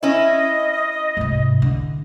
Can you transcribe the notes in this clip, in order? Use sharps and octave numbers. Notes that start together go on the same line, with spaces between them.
C#4 E4 D#5
G#2 C3
D3